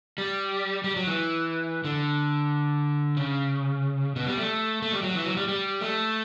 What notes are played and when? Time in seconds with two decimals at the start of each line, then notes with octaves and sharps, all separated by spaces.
0.18 G3
0.84 G3
0.96 F#3
1.07 E3
1.84 D3
3.17 C#3
4.16 B2
4.27 G3
4.38 A3
4.82 A3
4.93 G3
5.03 F#3
5.15 E3
5.26 F#3
5.37 G3
5.49 G3
5.81 A3